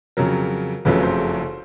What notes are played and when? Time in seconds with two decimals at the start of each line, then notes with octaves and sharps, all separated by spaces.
0.17 F2 C#3 F#3 A#4
0.85 F#1 F2 C#3 F#3 A3 B4
1.03 C5